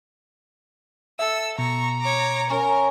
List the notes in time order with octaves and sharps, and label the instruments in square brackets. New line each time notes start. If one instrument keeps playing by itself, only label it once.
[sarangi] A4 [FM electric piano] E5 [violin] E6
[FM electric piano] B2 [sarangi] A#5 [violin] C#6
[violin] C#5 D6
[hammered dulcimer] C#4 [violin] A#4